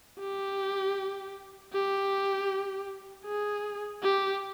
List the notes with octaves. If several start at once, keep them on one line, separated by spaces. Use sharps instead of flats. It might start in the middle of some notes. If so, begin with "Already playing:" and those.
G4
G4
G#4
G4